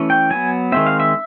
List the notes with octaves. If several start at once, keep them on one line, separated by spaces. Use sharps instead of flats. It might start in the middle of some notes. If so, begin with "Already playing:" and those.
Already playing: E3 A3 C#4
G5
F#3 B3 G#5
D#3 G#3 C4 E5
F5
E5